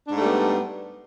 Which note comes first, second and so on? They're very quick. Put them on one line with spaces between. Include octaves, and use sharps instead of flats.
D4 G#2 A3 G3 B3